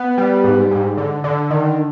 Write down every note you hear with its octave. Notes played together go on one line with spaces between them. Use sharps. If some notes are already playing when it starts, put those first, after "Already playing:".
Already playing: B3
G3
G#2
G#2
D3
D3
D#3